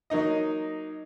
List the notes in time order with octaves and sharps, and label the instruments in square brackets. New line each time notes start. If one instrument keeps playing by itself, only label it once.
[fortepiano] F#3 A#3 D#4 D#5